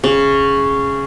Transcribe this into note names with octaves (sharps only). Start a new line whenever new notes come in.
C#3